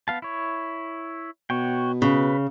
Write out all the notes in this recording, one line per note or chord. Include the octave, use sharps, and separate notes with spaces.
B3 F5 A5
E4 C#5
B2 F#4 C#5 G5
C#3 B4